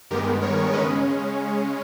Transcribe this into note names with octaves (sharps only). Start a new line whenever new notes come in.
G2 D#3 G#3 B3 G4 A#4
A#4 C#5
C#3 G#3 C#4 B4 D#5